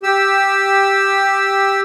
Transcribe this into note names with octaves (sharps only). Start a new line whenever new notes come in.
G4 E6